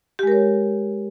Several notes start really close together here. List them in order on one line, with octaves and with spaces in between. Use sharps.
G4 G#3 A#4 C#5